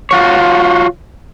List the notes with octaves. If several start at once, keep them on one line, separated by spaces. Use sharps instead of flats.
F4 F#4 C#5